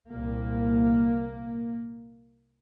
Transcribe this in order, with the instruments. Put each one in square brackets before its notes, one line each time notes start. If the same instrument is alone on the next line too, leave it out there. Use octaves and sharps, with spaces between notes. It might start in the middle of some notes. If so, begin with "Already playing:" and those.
[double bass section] C2 A#2 A#3